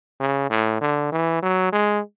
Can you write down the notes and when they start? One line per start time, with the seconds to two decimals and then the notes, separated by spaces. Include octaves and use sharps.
0.20 C#3
0.50 A2
0.81 D3
1.12 E3
1.43 F#3
1.73 G#3